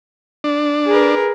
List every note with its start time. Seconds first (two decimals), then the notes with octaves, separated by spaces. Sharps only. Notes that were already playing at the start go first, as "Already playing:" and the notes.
0.44 D4
0.87 G#4 A#4 B4